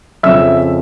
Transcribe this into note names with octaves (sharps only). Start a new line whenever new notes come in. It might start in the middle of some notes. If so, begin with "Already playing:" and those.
F2 C#3 F3 E5 E6